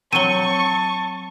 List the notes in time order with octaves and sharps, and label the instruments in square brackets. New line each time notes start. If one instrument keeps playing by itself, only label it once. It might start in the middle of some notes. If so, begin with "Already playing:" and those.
[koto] F#3 C4 [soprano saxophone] A5 [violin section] C#6 [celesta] D#7 G7